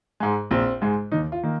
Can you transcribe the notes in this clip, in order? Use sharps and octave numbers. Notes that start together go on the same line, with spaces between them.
G#2 G#3
A#1 C4
G#2 G#3
D#2 D#4
F4
D#3 A#3